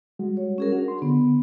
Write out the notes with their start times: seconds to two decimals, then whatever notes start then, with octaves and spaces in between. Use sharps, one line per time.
0.19 G3 G#3 F#4
0.37 C#5
0.58 C#4 G#4 A#4
0.72 D4 F#4
0.88 C6
1.02 D3 B3